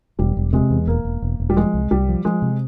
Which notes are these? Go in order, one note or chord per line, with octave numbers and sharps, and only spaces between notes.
E1 G3
E1
C3 G#3
E2
E1 A#3
E1
E1
E1
G3
F3 G#3
C2
C2 G3
F3
F3 G#3
C3